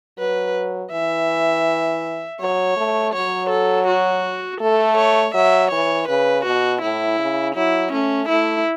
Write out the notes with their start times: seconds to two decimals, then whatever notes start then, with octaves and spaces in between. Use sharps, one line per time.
0.18 F#3 B4
0.92 E3 E5
2.40 F#3 C#5
2.77 A3
3.14 F#3 C#5
3.50 A4
3.88 F#4
4.61 A3 A4
4.97 C#5
5.34 F#3 E5
5.71 E3 C#5
6.09 C#3 B4
6.45 B2 F#4
6.82 A2 E4
7.19 C#3
7.55 F#3 E4
7.92 A3 C#4
8.29 A3 E4